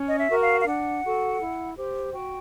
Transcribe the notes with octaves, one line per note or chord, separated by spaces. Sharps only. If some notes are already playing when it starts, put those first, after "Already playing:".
Already playing: C#4
D#5
E5
F#4 A#4
F5
F5
D4 F#5
F#4 A4
E4
G4 C5
F#4 G5